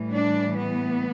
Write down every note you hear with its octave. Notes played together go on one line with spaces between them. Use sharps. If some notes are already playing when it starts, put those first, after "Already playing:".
Already playing: A2 E3 G3
D4
B3